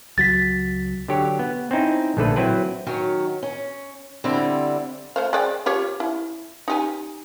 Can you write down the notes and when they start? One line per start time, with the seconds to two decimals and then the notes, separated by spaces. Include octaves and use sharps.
0.18 C#2 F#3 A6 B6
1.08 D3 F#3 G4 C#5
1.39 B3
1.71 C4 C#4 D#4 E4
2.17 A#1 D3 A3 A4 B4
2.36 F#3 C4 E4 B4
2.87 D#3 F#3 C#4
3.43 C#4
4.24 D3 G3 C4 E4 D5
5.16 A3 C5 F5
5.33 G#3 D5 G5
5.66 F4 G4 C#5
6.00 E4
6.68 D#4 G4 G#5